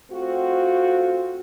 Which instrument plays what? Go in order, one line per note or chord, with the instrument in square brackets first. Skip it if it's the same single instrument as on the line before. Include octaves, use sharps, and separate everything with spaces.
[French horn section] A3 C4 F4 F#4